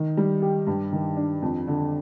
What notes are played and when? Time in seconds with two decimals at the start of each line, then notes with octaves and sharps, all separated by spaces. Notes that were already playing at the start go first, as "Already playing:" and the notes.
Already playing: D#3
0.17 G3
0.42 G4
0.67 G2
0.92 D#3
1.17 D4
1.42 F2
1.67 D3